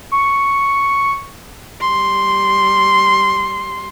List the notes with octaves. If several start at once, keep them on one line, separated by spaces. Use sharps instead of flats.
C#6
G3 C6